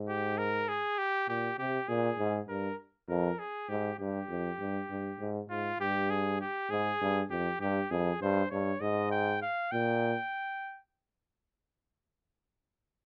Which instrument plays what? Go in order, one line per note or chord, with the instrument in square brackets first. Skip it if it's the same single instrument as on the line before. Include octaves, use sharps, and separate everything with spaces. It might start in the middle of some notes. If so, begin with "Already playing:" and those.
Already playing: [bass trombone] G#2
[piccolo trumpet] G4
A#4
G#4
G4
[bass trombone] A#2 [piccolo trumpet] G4
[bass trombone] C3 [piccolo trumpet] G4
[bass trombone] A#2 [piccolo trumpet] G#4
[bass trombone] G#2
[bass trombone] G2 [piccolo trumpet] A#4
[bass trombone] F2 [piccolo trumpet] A#4
[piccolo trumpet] G#4
[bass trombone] G#2 [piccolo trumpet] G4
[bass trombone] G2 [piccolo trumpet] G4
[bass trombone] F2
G2
G2
G#2
[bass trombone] G#2 [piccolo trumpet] F4
[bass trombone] G2 [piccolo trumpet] G4
[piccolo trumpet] G#4
G4
[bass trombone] G#2 [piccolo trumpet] G#4
[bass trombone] G2
[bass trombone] F2 [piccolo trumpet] G4
[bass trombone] G2 [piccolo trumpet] G4
[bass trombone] F2 [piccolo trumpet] G#4
[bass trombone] G2 [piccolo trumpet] C5
[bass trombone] G2 [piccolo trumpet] C#5
[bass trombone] G#2 [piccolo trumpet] D#5
[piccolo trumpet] G5
F5
[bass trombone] A#2 [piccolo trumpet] G5